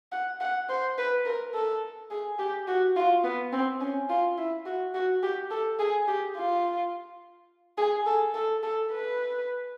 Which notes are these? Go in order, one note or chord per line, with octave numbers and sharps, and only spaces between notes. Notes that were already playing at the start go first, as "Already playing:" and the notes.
F#5
F#5
C5
B4
A#4
A4
G#4
G4
F#4
F4
B3
C4
C#4
F4
E4
F#4
F#4
G4
A4
G#4
G4
F4
G#4
A4
A4
A4
B4